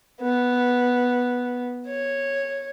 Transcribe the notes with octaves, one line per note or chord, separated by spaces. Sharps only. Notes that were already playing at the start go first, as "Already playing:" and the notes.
B3
C#5